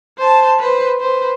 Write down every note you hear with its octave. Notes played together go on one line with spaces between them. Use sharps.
C5 A5
B4 C5
B4 C5